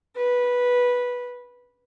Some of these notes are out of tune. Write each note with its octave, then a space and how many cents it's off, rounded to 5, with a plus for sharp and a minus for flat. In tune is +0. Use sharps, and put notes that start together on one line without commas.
B4 -10